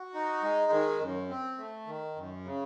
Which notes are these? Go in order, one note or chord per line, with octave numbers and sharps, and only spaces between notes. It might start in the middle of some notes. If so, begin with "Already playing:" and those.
Already playing: F#4
D#4
G#3
D#3
F#2
C4
A3
D#3
F#2
C#3